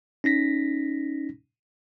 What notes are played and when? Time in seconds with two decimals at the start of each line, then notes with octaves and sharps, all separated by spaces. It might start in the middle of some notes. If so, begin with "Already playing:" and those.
0.24 C#4 D#4 A#6 B6